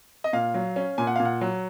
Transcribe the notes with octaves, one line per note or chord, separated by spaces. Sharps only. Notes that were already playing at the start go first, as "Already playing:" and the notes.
D#5
A#2 F5
F#3
C#4
A#2 G#5
F#5
A#2 F5
F#5
F#3